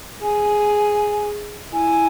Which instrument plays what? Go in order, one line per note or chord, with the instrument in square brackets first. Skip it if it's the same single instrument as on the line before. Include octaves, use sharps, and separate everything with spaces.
[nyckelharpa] G#4 [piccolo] G#5
[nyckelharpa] E4 [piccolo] G#5